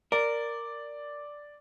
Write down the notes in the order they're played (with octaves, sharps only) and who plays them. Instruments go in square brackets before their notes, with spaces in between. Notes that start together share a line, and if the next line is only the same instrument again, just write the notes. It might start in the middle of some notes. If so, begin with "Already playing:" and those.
[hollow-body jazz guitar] A#4 [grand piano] D5